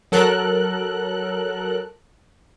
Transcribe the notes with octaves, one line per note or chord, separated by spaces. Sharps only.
F#3 A4 A#4 F#6